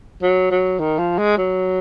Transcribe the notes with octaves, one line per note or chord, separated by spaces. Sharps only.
F#3
F#3
D#3
F3
G#3
F#3